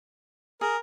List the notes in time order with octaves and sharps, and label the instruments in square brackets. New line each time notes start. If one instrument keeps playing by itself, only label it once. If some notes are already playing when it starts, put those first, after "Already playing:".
[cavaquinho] G#4 [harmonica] A#4